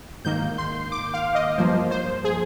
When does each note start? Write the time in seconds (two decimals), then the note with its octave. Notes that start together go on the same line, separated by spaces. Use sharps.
0.25 G#2 D#3 A#3 G6
0.58 C6
0.92 D6
1.14 F5
1.35 D#5
1.58 G2 F3 A#3 C5
1.91 C5
2.24 G#4